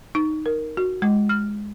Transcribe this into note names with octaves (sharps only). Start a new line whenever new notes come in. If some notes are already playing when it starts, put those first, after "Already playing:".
D#4
A#4
F#4
G#3
F6